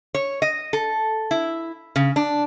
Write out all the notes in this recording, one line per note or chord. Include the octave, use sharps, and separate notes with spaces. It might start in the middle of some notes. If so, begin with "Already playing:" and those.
C#5
D#5
A4
E4
C#3
D4